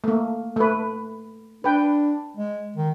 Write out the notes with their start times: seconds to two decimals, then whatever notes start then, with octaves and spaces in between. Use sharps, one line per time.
0.04 A3 A#3
0.56 A3 B4
1.64 D4 B4 G5
2.37 G#3
2.76 D#3